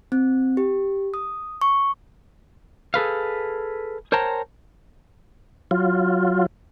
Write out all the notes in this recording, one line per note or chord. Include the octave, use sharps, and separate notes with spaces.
C4
G4
D#6
C#6
G#4 A4 B4 F5
A#4 C5 C#5 G5 A5 A#5
F#3 F4